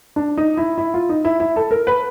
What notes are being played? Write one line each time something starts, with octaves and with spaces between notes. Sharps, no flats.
D4
D#4
E4
E4
F4
D#4
E4
E4
A4
A#4
B4